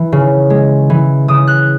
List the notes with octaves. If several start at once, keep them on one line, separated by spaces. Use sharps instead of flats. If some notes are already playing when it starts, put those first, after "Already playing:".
Already playing: E3
C#3
G#3
E3
C#3 D#6
F#6